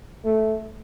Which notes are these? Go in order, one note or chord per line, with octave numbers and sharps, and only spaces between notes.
A3